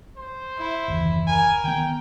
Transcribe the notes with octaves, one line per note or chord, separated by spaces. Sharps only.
C5
E4
F#1 D#2 E3
A#4 G#5
D#3 B3 G5